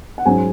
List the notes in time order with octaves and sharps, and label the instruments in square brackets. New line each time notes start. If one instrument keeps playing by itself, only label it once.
[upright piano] F#5
G#2 F#3 C#4 G#5